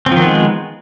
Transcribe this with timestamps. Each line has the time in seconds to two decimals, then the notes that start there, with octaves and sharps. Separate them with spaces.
0.06 C4
0.11 F3
0.16 D#3
0.21 B3
0.26 G#3